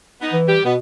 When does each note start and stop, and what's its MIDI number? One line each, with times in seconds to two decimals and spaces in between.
0.21 0.39 59
0.21 0.39 63
0.33 0.55 52
0.48 0.64 55
0.48 0.64 67
0.65 0.77 47
0.65 0.74 59